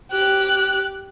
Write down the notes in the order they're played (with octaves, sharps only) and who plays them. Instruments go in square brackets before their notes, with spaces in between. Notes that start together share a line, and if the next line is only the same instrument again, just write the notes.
[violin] G4 F#6